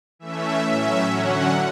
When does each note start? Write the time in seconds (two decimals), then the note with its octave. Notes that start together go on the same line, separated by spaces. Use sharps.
0.19 E3 A3 C#4 E5
0.65 A2 F#3 C#4 E5
1.11 D3 F#3 C#4 F#5